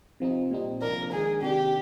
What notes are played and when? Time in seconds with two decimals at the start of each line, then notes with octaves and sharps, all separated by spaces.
0.20 C3 F3 C4 D#4
0.51 A#2 G3 C4 D#4
0.81 C3 F3 A#3 D4 A#4
1.12 D#3 G#3 D4 G#4
1.42 C3 D#3 A#3 D4 G4